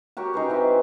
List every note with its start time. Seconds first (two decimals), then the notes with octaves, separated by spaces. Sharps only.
0.17 F#4 G4 A#4 C#5
0.34 C#4 D#4 G#4 B4
0.50 E3 C4